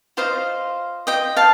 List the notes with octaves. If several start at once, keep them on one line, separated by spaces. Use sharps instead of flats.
F4 C5 D#5 F5
D#5 G5
F5 A5